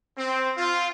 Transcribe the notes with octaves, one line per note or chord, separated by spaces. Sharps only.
C4
F4